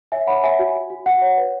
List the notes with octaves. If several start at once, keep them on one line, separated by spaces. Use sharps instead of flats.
C#5 E5 G#5
C#5 F#5 B5
C#5 E5 G#5
F#4
F#4
F#4
F#4 F#5
C#5
B4